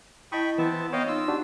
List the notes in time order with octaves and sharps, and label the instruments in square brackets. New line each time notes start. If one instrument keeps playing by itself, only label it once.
[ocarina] E4 [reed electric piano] D#5 A5 D#6 [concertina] G5 B5 C#6
[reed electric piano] E3 [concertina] B3 C4 A5
[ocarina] B3 [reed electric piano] C#5 [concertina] D#5 F5 G5
[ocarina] D#4 [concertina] F4 E6
[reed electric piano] D4 F#4 G4